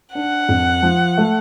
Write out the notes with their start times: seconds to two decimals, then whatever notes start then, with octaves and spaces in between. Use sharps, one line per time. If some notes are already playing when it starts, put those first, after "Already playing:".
0.15 D4 F#5
0.49 F2
0.83 F3
1.18 A3